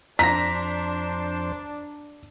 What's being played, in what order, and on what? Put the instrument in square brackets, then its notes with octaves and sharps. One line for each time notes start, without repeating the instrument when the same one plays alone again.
[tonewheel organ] F2 C5 [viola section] D4 [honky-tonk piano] A#5 A#6 [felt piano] B6